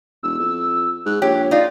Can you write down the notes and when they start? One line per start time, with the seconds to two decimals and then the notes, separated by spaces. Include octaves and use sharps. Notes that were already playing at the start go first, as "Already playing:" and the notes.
0.23 E1 E6
0.39 F2
1.06 G#2 F#6
1.22 A#1 G4 C#5
1.51 D#4 F4 D5